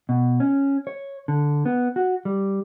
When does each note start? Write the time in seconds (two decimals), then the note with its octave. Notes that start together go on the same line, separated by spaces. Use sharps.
0.09 B2
0.40 C#4
0.87 C#5
1.28 D3
1.65 B3
1.96 F#4
2.25 G3